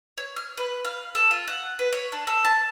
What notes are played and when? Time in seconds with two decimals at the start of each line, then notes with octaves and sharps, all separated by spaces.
0.18 C#5
0.36 F6
0.57 B4
0.85 F5
1.15 A4
1.31 F4
1.48 F#5
1.79 B4
1.93 C#5
2.12 D4
2.27 A4
2.45 A5